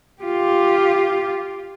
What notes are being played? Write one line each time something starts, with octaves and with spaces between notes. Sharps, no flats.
F4 G4